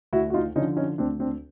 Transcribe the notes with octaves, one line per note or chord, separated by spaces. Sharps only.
D2 E4 F#4
F#4
D#4 F4
D3 F3 C#4 D#4
C#4 D#4
D2 C4 D4
C4 D4